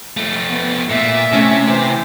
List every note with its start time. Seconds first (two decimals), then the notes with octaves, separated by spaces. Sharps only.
0.17 F3 A3
0.49 B3
0.90 A#2 E5
1.32 C3 A3 C#4 A5
1.67 E3 C5